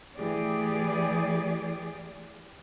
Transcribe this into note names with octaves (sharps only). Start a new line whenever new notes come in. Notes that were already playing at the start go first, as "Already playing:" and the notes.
E3 A3 G4 G#4 D5